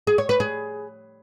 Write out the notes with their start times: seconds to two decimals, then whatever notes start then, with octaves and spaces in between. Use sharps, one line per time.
0.07 G#4
0.18 C#5
0.29 B4
0.40 G#4